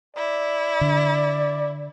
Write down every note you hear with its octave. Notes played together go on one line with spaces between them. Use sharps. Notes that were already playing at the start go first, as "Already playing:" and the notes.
E4 D5
D3